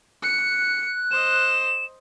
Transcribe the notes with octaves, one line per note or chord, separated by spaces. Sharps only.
F#6 C#7
C5 D#5 E7